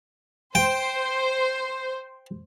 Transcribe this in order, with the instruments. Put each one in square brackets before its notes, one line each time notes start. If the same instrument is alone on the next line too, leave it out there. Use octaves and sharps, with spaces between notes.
[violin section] C5 [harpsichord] G5